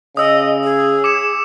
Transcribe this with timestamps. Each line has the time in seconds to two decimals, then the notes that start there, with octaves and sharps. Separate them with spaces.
0.17 C#3 D#5 D#6 E6
0.64 G#4
1.04 D6 C#7 E7